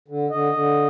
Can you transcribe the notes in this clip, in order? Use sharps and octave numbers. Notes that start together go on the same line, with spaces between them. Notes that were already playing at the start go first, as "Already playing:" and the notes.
D3
D3 D#5
D3